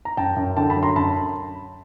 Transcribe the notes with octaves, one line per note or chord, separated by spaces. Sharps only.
A#5
F#2 G5 A5
F#2
D3 G5 A5
A5 B5
F#3
A#5 C6
F#2 A5 B5